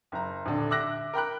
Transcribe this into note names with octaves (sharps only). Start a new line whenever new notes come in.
F#1 A#5
D#1 D3 D4
E5 D6 E6 F#6 A#6
A#4 G5 B5 F#6